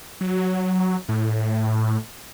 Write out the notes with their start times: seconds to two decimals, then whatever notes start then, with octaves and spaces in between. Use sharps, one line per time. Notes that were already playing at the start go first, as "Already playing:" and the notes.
0.21 F#3
1.09 A2